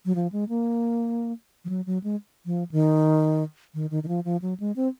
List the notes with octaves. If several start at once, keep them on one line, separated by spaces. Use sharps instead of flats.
F#3
F3
G#3
A#3
F3
F#3
F#3
G#3
F3
D#3
D#3
D#3
D#3
F3
F3
F#3
G#3
C4